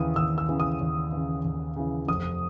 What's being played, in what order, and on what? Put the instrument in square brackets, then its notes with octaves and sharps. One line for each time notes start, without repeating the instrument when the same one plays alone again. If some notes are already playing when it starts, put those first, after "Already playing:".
Already playing: [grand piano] D#2 C#3 E3 D#6
D#2 E6
E6
C#3 E3
D#6
D#2
C#3 E3
D#2
C#3 E3
F1 D#6